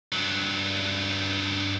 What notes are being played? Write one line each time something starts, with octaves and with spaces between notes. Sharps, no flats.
G2 F#3